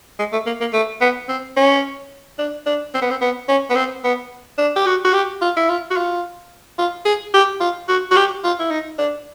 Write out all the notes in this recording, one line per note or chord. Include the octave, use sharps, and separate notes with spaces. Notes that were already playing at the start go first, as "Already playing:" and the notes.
G#3
A3
A#3
A#3
A3
B3
C4
C#4
D4
D4
C4
B3
C4
B3
C#4
B3
C4
B3
D4
G4
F#4
F#4
G4
F4
E4
F4
F#4
F4
F4
G#4
G4
F4
F#4
F#4
G4
F4
E4
D#4
D4